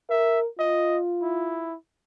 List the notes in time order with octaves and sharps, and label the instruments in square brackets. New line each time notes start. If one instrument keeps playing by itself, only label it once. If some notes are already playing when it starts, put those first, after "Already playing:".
[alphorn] A#4 [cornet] E5
[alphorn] F4 [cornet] D#5
[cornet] E4